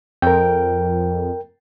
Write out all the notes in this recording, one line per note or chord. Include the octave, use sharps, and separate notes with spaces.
F2 A#4 G5